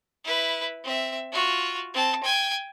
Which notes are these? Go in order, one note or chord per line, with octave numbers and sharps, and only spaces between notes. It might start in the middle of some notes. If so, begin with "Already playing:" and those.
E4 B4
C4 E5
F4 F#4
C4 A5
G5 G#5